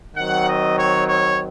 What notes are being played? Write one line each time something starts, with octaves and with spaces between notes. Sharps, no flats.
D#3 F#3 C4 F#5
D#5
C#5
C#5